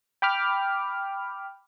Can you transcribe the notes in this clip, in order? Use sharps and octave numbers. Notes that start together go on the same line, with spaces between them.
G5 B5 D6 F6